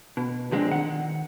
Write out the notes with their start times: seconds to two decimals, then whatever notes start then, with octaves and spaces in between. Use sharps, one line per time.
0.17 B2
0.51 D3 F3 G#3 A#3 C4 D4
0.68 D#3 F#5